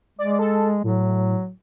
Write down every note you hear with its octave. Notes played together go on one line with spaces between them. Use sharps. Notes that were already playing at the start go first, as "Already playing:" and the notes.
G#3 D5
A4
A2 F#3